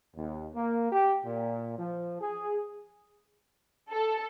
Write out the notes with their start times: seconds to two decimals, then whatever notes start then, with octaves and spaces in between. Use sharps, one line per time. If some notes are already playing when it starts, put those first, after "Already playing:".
0.16 D#2
0.55 A#3
0.92 G4
1.25 A#2
1.79 F3
2.21 G#4
3.90 A4